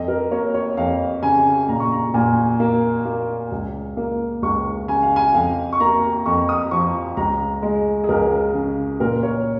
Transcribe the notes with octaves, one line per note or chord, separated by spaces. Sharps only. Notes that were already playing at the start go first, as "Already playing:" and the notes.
Already playing: F2 D#5
A#4
A#3 C#5
C#5
F2 F5
C#3 G#5
A#2 A#5
C#6
A#5
A#2 G#5
A#3
A#3
C#2
A#3
C#2 C#6
C#3 G#5
F5
G#5
F2 F5
C#6
A#3 A#5
F2 C#6
D#6
F3 C#6
C#2 A#5
G#3
G#4
C#2 A#4
C#3
A#2 A#4
C#5